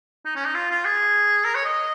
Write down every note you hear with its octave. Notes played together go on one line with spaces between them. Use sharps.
D#4
C#4
D#4
F4
F4
G#4
A#4
C#5
D#5